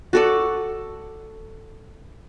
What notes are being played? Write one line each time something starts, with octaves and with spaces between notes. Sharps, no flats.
F#4 A4 D5